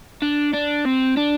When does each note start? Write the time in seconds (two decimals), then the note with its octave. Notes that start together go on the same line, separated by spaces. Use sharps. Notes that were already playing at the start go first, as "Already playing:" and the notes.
0.22 D4
0.54 D4
0.86 C4
1.17 D4